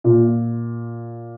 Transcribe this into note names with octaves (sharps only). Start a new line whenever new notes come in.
A#2